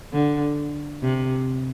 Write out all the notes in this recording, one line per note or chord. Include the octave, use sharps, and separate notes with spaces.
D3
C3